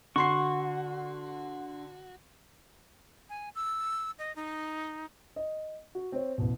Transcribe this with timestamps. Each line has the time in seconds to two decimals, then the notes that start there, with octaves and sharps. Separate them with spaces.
0.16 D3 F#4 C6 C#6 C7
3.29 G#5
3.55 E6
4.19 D#5
4.36 D#4
5.36 D#5
5.95 F#4
6.12 C4 C#5
6.38 A1 B2